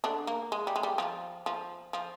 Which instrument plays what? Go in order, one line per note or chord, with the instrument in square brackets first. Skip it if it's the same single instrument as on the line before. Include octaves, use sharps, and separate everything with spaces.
[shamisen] D3 D4
A#3
G#3
G3
G#3
G3
F3
F3
F3